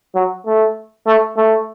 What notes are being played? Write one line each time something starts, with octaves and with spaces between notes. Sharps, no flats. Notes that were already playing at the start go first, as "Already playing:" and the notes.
F#3
A3
A3
A3